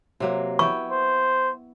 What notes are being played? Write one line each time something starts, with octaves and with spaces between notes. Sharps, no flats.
C3 F#3 A#3
B3 E4 G5 C#6
C5